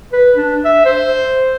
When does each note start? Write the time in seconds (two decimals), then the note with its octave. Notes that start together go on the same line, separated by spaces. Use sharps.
0.13 B4
0.36 D4
0.65 E5
0.85 C5